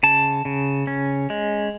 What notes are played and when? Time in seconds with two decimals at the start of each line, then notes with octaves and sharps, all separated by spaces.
0.03 C#3 A5
0.45 C#3
0.87 C#4
1.30 G#3